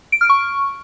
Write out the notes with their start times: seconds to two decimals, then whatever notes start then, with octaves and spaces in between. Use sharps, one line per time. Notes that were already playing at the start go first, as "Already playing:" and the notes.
0.12 D7
0.21 F6
0.30 C#6